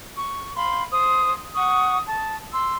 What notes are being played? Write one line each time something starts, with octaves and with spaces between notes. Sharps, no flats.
C#6
F5 B5 C6
C5 D#6
F#5 C#6 D#6
A5
C6 E6